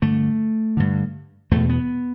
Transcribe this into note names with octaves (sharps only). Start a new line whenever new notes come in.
G2 D3 A3
G2 D3
E2 B2 A3
B3